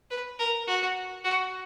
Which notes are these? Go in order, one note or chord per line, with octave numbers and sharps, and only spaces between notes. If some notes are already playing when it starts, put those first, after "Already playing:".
B4
A#4
F#4
F#4